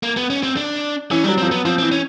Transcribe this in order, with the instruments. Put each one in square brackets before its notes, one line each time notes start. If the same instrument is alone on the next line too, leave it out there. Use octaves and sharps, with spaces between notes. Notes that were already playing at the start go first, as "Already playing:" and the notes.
[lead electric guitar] A#3
B3
C#4
C4
D4
[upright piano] E3 [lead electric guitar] C#4
[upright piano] G3 [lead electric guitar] D4
[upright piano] F#3
[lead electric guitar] C4
[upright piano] F3
[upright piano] F#3 [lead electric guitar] B3
[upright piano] F3 [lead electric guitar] C4
[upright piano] E3 [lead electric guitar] C4
[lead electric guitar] C#4